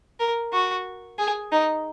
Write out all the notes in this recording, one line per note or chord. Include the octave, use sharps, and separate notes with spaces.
A#4
F#4
G#4
D#4